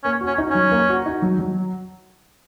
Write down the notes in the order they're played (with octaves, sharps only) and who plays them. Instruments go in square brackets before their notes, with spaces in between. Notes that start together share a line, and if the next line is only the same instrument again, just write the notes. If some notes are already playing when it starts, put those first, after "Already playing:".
[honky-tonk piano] A#3 [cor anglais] C#4
[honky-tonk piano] F#4
[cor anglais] C#4
[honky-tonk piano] D#4
[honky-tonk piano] F#3 [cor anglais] C#4
[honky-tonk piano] A#3
F#4
D#4
F#3
F#3